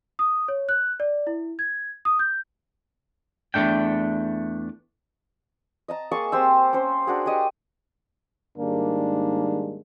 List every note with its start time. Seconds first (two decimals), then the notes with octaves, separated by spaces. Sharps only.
0.19 D#6
0.48 C#5
0.69 F#6
1.00 D5
1.27 E4
1.59 G#6
2.05 D#6
2.19 G6
3.54 E2 D#3 A3 D4 G5
5.88 D#5 A5 A#5
6.11 A#3 G#4 A5 C#6
6.32 C4 G4 C5 E6
6.73 C#4 C5
7.07 D4 F#4 G#4
7.26 G4 C#5 D#5
8.59 G#2 D#3 G3 G#3 A#3 D4